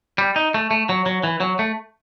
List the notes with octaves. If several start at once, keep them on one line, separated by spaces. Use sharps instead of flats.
G3
D#4
A3
A3
F#3
F#3
E3
F#3
A3